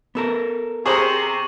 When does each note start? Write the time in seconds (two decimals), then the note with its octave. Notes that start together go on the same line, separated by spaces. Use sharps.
0.15 B3 A4 A#4
0.86 C3 G#4 C5 A#5 C#6 D6 F#7